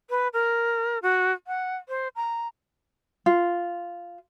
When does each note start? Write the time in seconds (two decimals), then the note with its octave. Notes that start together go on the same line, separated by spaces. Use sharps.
0.10 B4
0.33 A#4
1.02 F#4
1.47 F#5
1.89 C5
2.16 A#5
3.26 F4